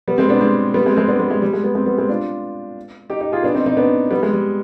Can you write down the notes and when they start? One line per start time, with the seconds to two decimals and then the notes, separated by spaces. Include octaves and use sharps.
0.08 G3 B3
0.18 G#3 C4
0.29 B3 D4
0.41 G#3 C4
0.74 G3 B3
0.86 G#3 C4
0.96 G#3 C4
1.08 B3 D4
1.19 G3 B3
1.31 G#3
1.42 G3
1.53 G#3
1.64 G3 B3
1.75 G#3 C4
1.86 G3 B3
1.98 G#3 C4
2.09 D4 F4
3.10 D#4 G4
3.21 D#4 G4
3.32 F4 G#4
3.43 B3 D4
3.54 C4 D#4
3.66 C4 D#4
3.77 B3 D4
4.11 G3 B3
4.23 G#3
4.33 G3